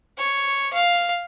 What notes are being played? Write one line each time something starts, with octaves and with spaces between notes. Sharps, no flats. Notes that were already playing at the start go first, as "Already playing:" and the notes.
C#5
F5